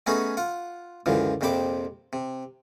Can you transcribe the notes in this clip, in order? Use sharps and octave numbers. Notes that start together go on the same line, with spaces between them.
A3 B3 C#4 D#4 F#4 G#4
F4 F#5
C#2 F#2 D3 E3 F3
A#1 F2 C3 C5 B5 D6
C3